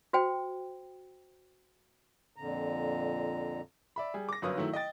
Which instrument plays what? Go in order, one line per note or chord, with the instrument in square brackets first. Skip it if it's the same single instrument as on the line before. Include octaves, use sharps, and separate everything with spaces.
[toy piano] F#4 C5 G5
[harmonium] F2 A#2 D3 A#5
[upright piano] D5 E5 B5
G3 G#4
D6 A#6
G1 F#2 B4 C#5 F5 D#6
D#3 F#3 A3 E4
D#5 G5 A6